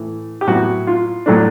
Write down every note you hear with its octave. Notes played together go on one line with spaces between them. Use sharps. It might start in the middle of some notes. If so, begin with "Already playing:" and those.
Already playing: A2 E3 A3
G4
A2 F#3 B3 E4 F#4
F4
A2 F#3 A3 D4